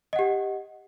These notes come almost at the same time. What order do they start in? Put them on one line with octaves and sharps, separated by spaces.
D#5 F#5 G4